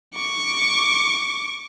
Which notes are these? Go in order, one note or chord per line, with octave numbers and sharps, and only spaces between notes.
C#6 D6